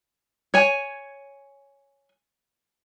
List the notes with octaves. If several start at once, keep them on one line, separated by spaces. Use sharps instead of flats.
C#5 G#5